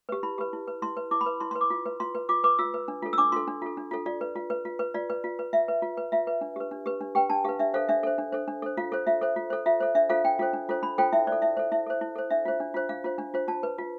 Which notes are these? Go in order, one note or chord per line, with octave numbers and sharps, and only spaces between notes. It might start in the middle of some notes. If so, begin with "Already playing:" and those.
G4 B4
E4 B5
G4 B4
E4
B4
E4 C6
B4
E4 D6
B5
B4
E4 C6
C6
B4
D6
F4
B4
F4 C6
B4
F4 D6
B4 D6
F4 E6
B4
D4
F4 A4
E6
D4 D6
F4 A4 C6
D4
F4 A4
D4
F4 A4
F4 D5
B4
F4
B4
F4
B4
F4 D5
B4
F4
B4
F4 E5
B4
F4
B4
F4 E5
B4
D4
G4 B4
D4
G4 B4
D4
G4 B4 G5
D4 A5
G4 B4 F5
D4 E5
A4 C5 F5
D4 E5
A4 C5
D4
A4 C5
D4
A4 C5
F4 F5
A4 C5
F4 E5
A4 C5
F4
A4 C5
F4 E5
A4 C5
D4 E5
F4 A4 C5 F5
D4 G5
F4 A4 C5
D4
F4 A4 C5
D4 B5
F4 A4 C5 G5
E4 E5
C5 D5
A4
E4 E5
A4 C5
E4 E5
A4 C5
E4
A4 C5
D4 E5
F4 C5
D4
F4 C5
D4 F5
F4 C5
D4
F4 C5
F4 A5
B4
F4